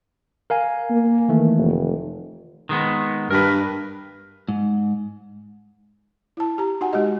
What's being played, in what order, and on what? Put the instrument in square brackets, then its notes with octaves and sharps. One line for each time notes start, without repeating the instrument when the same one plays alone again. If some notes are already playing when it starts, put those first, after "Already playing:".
[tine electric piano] A#4 F5 G#5
[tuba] A#3
[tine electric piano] D#3 E3 A3
[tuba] F1
[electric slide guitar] D#3 G#3 B3
[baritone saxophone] G2 [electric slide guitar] A#4 B4
[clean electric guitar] G#2
[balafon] E4 A5
G4 A#5
D#4 F#4 F#5 G#5
G#3 F#4 G4 D#5